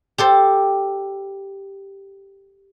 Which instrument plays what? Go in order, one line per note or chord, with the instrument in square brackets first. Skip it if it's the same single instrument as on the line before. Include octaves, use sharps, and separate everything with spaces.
[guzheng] G4 A4 C5